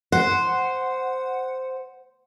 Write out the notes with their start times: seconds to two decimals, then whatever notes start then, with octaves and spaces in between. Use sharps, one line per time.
0.12 C5 F#5